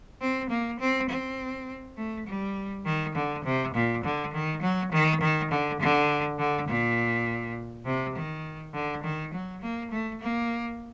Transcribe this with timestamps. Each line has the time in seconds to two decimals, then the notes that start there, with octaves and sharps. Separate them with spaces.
0.21 C4
0.50 A#3
0.80 C4
1.10 C4
1.97 A3
2.27 G3
2.85 D#3
3.15 D3
3.44 C3
3.74 A#2
4.04 D3
4.33 D#3
4.62 F#3
4.92 D#3
5.21 D#3
5.51 D3
5.80 D3
6.38 D3
6.68 A#2
7.85 C3
8.16 D#3
8.74 D3
9.04 D#3
9.34 F#3
9.62 A#3
9.91 A3
10.21 A#3